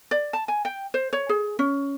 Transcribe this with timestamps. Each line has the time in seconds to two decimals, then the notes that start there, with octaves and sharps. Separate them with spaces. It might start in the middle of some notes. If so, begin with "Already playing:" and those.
0.11 D5
0.33 A5
0.48 G#5
0.65 G5
0.94 C5
1.13 C#5
1.29 G#4
1.59 C#4